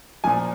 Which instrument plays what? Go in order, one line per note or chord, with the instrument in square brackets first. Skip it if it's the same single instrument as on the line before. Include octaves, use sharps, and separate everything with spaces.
[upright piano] A#2 F3 G#5